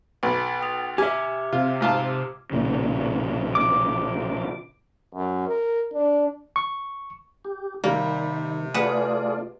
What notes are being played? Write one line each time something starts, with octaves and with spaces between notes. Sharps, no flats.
B1 B5
G5 D#6 F7
G4 E5 G#5 D6 F6 G#6
C3 F4
G#2 F4 A5
B1 A#2 C#3
D6
F#2
A#4
D4
C#6
G4
C3 D#3 G3 A#3
A3 F4 G#4 B4 D5 F#5